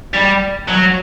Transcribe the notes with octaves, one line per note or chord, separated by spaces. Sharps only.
G3
F#3